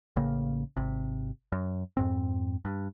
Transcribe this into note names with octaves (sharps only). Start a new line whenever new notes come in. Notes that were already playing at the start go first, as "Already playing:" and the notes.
A1 C#3 A#3
G#1 C3
F#2
F2 G#2 C4
G2